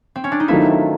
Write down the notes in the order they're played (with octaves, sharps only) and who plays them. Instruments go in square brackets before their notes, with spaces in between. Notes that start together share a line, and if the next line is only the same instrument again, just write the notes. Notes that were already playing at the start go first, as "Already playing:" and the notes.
[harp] C4
C#4
D4
D#4
[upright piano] D#3 F#3 A3 C4 F4 [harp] E4